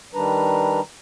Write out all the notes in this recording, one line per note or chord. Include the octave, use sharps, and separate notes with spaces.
D#3 G3 D4 B4 A#5